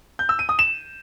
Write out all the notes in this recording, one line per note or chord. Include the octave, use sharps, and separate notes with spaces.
G6
E6
D#7
D#6
E7